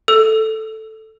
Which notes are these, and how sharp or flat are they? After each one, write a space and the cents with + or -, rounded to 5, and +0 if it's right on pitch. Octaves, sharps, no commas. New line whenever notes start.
A4 +0 E6 +20